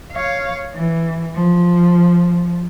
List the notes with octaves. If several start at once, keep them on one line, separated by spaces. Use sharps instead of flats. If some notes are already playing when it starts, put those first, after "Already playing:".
C#5 F5
E3
F3